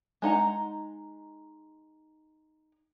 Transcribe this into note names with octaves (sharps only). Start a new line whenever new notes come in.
G#3 D#4 F#5 A#5